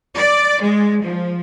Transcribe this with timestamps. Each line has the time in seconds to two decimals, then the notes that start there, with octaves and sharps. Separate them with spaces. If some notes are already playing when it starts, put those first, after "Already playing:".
0.16 D5
0.62 G#3
1.02 F3